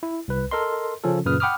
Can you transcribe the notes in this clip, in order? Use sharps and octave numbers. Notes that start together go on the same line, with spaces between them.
E4
C2 B4
A4 A#4 D#5 C6
C#3 F3 C#4 F4 A4
F#2 A#2 C#3 B4 D#6 F6
F#5 G5 B5 D6 D#6 F6